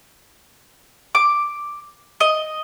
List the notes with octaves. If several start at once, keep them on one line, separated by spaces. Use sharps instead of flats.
D6
D#5